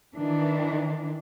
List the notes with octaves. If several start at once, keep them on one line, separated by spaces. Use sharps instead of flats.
D#3 E3 D4